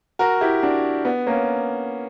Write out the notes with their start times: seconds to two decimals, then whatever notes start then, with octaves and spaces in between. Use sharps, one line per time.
0.19 F#4 A#4
0.41 E4 G4
0.62 D4 F#4
1.05 B3
1.26 A#3 C#4